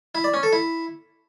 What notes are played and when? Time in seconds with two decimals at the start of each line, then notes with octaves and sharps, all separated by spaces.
0.15 E4
0.24 D5
0.34 C#4
0.43 A4
0.53 E4